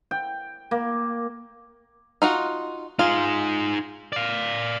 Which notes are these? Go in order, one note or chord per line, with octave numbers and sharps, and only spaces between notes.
G5
A#3
D#4 F4 F#4
D#4 F4 G#4
D5 F5